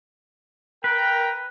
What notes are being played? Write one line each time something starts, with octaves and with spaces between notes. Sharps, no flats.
A#4 B4 G5